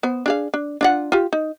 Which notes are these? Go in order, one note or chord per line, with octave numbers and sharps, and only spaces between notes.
B3 C5
D4 G#4 F5
D4
D4 F4 F#5
F4 G4
D#4